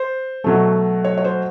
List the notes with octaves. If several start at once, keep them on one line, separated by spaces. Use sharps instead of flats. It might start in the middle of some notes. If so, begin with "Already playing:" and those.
Already playing: C5
B2 F#3 A3
C#5
C#5
C5